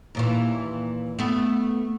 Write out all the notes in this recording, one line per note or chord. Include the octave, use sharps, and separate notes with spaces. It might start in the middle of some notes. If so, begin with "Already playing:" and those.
D#2 A#2 E3
A3 B3